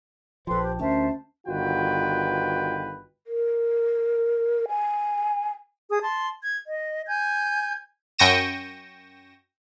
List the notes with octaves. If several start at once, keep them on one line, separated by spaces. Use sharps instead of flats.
A#1 F3 A4 B4 C5 G5 A5 C6
G4
D2 C#4 A#4 C5 E5 A5
G1 D#3 F4 F#4 B4 G5
A#4
G#5
G#4 D#6
A5 C6
G#6
D#5
G#5 G6 G#6
F#2 G5 C#6 A#6 D#7 E7